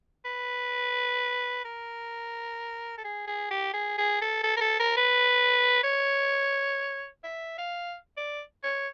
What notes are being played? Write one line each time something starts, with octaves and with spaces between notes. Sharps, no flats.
B4
A#4
A4
G#4
G#4
G4
G#4
G#4
A4
A4
A#4
A4
A#4
B4
C#5
E5
F5
D5
C#5